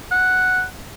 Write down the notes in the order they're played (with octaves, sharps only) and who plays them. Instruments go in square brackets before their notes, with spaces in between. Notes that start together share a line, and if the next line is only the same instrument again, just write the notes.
[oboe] F#5